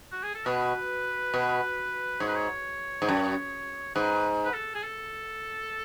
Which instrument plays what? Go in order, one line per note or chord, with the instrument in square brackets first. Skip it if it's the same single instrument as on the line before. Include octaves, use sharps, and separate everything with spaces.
[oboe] F#4
G#4
A4
[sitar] B2 [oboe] B4
[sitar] B2
[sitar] G#2 [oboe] C#5
[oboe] B4
C#5
[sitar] G#2
F#2
[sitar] G#2 [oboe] B4
[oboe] B4
A4
G#4
A4